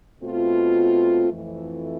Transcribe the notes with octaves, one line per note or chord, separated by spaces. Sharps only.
B2 A3 C4 F4
F2 E3 A3